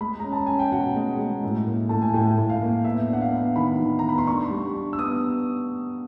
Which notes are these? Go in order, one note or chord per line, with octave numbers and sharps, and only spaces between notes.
G#3 B5
C#4 A#5
A5
C#4 G#5
G5
B2 F#5
G#3
G#3
A2
A#3
A2 A5
G#5
A2 G5
A2
F5
A#3
B3 E5
D4 F#5
F5
B3
D#3 B5
D#3
B3 A#5
B5
C6
D4 C#6
G3
D4
E6
B3 D#6